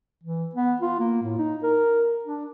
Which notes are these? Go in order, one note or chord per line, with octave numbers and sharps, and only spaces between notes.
E3
B3
F4
A#3
A2
D#4
A#4
D4